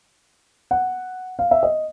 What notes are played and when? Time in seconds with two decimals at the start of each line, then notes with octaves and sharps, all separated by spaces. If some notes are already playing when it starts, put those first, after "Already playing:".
0.71 F#5
1.39 F5
1.51 E5
1.63 D#5